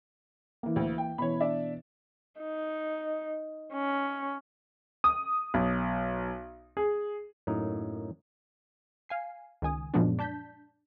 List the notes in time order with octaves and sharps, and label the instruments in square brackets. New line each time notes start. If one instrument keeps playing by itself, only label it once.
[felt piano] E3 A#3
[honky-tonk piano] D2
G5
[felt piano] B2 E3 [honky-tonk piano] C#5 B5
[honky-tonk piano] D4 D5 E5
[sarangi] D#4
C#4
[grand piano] D#6
B1
G#4
[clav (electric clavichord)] F#2 A2 A#3 D#4
[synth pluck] F5 G#5 C7
C#2 D#3 G#5 D#6
F#2 A#2 F3 G#3 B3 D4
D4 A5 G6 B6